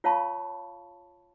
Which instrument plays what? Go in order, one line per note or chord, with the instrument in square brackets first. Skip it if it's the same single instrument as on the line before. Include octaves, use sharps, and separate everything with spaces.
[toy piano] F4 C#5 F5 A5 B5 C#6